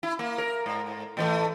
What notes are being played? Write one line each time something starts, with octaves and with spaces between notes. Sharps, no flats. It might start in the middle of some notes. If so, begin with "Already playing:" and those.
E4
A#3
A#4
G#2
A2 E3 A3